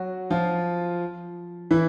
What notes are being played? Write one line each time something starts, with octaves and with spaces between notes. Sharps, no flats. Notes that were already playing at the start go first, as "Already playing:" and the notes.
Already playing: F#3 F#4
F3 F4
E3 E4